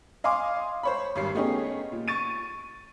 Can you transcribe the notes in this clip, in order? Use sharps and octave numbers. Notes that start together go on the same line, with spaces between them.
D#5 F5 G#5 C6 D6
C5 C#5 B5
G#1 G2 C7
A3 B3 C#4 D#4 G4 G#4
A#2
C#6 A6 D#7